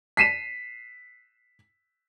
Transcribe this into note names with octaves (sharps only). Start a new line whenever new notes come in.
B6 C7 D#7 E7